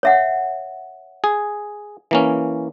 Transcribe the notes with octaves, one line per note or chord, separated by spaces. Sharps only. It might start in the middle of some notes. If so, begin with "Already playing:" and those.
C#5 E5 F#5
G#4
E3 A#3 C#4